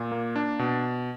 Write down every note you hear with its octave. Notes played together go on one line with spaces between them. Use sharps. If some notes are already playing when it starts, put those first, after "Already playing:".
Already playing: A#2
A#3
D4
B2